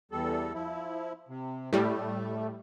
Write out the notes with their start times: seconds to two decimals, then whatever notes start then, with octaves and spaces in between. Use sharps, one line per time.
0.12 E2 G3 A4
0.54 F3 E4
1.29 C3
1.73 A2 G3 A3